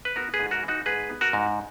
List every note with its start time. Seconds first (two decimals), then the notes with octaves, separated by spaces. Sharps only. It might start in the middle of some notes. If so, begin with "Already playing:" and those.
0.05 B4
0.16 B3 F#4 A#4
0.34 G#4 B4
0.39 G#2
0.51 F#4 A#4
0.63 E3
0.68 D#4 F#4
0.86 G#2 G#4 B4
1.09 B3
1.21 F#4 A#4
1.33 G#2